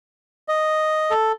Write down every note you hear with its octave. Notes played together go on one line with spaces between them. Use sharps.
D#5
A4